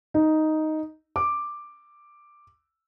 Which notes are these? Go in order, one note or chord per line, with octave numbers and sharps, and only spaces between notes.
D#4
D6